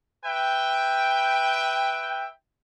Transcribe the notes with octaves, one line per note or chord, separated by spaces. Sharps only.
B4 E5 G5